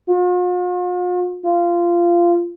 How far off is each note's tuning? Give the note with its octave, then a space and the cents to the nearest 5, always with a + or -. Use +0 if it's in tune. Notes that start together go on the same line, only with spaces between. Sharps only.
F4 +45
F4 -15